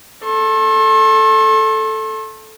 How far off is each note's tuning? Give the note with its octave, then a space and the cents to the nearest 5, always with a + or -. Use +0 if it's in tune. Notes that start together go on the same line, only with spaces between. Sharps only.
A4 +0 C6 +45